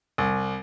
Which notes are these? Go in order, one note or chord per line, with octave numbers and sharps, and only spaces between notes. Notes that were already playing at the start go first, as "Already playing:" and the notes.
C2